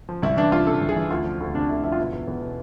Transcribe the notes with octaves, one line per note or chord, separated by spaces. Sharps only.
F3
C2 E4
E3 D4
C2 F4
C3 A4
C2
G#4
E3
D2 F4
F3
D2
C3 D4
D2 E4
F3 E4
F4
B2 E4
E2
E2
B2